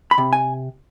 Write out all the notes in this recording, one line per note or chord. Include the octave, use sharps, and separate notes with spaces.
B5
C3
G#5